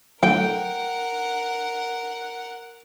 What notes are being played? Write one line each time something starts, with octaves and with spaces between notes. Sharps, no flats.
D3 F#3 A3 A#4 F#5 G5